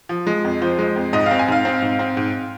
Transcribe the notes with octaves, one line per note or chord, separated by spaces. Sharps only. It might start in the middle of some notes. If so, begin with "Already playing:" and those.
F3
G#3
F2
F3 C5
G#3
F2
G#2 D#5
C4 F5
G#5
G#2 F5
C4
G#2
C4
G#2